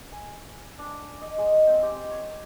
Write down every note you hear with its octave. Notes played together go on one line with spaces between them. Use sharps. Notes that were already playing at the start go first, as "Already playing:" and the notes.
G#5
D4
D#5
G#3
C4
G4
C#5